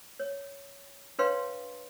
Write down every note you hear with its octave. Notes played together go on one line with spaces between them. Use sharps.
C#5
D4 B4 C#5 F5 G5 C6